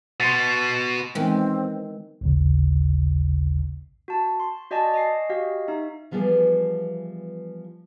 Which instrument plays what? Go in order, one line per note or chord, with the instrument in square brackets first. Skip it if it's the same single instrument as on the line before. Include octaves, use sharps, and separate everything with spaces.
[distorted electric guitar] B2 [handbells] C6 A6
[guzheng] D#3 E3 [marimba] G#3 B3 [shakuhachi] C4
[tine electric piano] A1 D#2 C#3
[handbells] F#4 A5
C6
F#4 D5 D#5 G#5 A5
D#5 G#5 C7
F#4 G4 D#5 F5
D#4 E5
[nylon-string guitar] E3 F3 G3 B3 G#4